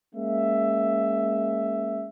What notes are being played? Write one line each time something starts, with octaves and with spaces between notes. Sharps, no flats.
G#3 A#3 C#4 E5